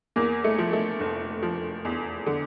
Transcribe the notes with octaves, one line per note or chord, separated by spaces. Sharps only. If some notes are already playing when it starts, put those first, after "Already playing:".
E2 A#3
A3
F3
A3
F1
F3
E2
D3